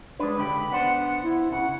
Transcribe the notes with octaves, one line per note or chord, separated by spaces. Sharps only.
G#3 D4 B4
C#2 D3 G4 B5
B3 D4 C5 F#5
E4
C#3 F#5